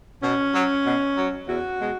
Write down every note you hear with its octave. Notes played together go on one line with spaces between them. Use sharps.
B2 C#4
F#3
B2
F#3
E2 F#4
B2 G#3